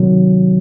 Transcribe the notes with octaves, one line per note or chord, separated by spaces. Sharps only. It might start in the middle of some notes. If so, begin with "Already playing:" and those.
Already playing: C3 D#3 F#3